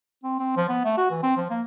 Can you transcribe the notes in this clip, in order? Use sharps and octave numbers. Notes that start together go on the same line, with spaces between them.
C4
C4
F3
B3
A3
F#4
E3
C4
F3
A#3